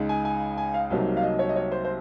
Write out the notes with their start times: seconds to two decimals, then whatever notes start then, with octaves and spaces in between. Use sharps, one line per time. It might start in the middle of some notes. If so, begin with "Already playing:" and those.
Already playing: C#2 C#3 G#3 D#4
0.09 G#5
0.25 G#5
0.58 G#5
0.74 F5
0.91 C2 C3 F#3 A#3 D#4
1.17 F5
1.23 D#5
1.39 C#5
1.49 D#5
1.56 C#5
1.72 C5
1.85 C5